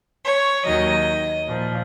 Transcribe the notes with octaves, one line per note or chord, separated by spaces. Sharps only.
C#5
D#2 D#3 F#3 D#5
A#2 F3